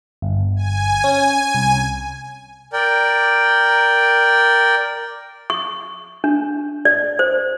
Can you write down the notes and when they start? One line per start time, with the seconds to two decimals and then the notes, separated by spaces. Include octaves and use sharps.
0.22 G1
0.56 G#5
1.04 C#4
1.55 C2
2.73 A#4 D5 G5
5.50 C#6
6.24 D4
6.85 D5
7.19 C5